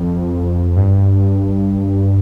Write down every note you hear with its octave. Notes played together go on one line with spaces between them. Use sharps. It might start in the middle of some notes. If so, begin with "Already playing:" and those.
Already playing: F2
G2